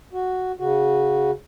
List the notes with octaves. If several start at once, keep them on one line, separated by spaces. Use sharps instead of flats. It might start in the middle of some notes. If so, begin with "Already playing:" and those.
F#4
C#3 F#4